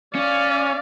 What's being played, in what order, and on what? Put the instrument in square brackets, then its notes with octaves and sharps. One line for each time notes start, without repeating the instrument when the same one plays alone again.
[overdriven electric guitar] C#4 [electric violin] D5 F5